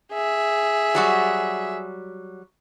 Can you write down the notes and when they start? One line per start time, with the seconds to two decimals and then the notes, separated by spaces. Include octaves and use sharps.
0.13 G#4 E5
0.95 F#3 G3 F#4